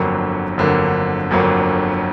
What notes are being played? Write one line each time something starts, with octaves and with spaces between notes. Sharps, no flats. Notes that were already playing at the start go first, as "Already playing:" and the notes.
Already playing: G1 F2 D3 F#3 A#3
G1 F2 D3 F#3 A#3
G1 F2 D3 F#3 A#3